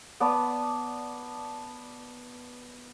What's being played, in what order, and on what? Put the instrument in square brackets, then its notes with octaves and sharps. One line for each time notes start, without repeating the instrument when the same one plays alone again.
[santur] B3 D5 A5